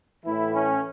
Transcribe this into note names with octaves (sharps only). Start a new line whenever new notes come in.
A2 E3 E4
C#4